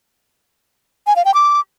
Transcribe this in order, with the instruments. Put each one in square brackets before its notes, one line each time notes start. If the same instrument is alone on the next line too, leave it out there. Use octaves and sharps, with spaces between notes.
[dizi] G#5
F5
G5
D6